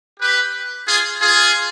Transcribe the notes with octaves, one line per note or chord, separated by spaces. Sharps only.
G4 B4
F4 G#4
F4 G#4